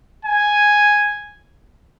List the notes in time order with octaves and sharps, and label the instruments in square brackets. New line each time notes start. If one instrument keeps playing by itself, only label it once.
[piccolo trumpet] G#5